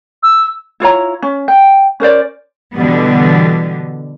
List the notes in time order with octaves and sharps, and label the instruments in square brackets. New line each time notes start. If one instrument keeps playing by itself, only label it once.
[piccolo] E6
[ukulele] E4 F4 C#5 A#5
C#4
G5
C#4 A#4 C5 D5
[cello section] B2 D3 E3 G3 B3